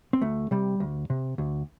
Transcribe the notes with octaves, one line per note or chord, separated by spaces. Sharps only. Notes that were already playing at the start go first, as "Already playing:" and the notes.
C4
D2 A3
C3 G3
D2
C3
D2